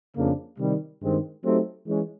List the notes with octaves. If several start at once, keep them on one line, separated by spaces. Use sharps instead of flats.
F2 C#3 F3 A#3 D4
C3 D#3 G3
G2 D#3 G#3 C4
F#3 A3 C4 D#4 G4
E3 G#3 C#4